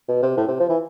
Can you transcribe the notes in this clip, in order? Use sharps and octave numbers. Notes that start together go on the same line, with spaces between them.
B2
C3
A2
C3
F3
E3